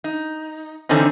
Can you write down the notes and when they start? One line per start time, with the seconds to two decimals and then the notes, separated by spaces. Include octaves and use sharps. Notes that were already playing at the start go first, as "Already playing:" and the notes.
0.04 D#4
0.89 D3 E3 C4 C#4 D#4